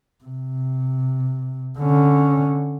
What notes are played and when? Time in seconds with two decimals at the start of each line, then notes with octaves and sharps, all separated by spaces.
0.24 C3
1.79 D3 C#4